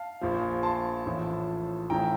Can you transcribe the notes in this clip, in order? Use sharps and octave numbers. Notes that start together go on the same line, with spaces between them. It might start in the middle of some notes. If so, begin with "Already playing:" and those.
Already playing: F5 A5
A#1 A#2 F3
A5 C6
A1 A2 F3
A1 A2 F3 G5 A#5